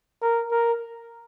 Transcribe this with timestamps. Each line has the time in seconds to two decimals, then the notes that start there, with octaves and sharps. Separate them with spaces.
0.22 A#4
0.52 A#4